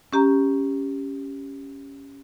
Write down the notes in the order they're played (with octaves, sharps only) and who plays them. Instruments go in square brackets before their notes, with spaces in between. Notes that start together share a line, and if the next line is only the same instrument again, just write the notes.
[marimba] C#4 G4 A#5